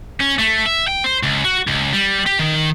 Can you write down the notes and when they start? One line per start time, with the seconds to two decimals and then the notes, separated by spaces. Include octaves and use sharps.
0.20 C#4
0.38 A3
0.66 E5
0.88 G5
1.04 C5
1.23 C#2
1.44 F#4
1.67 C#2
1.93 G3
2.26 G4
2.39 D#3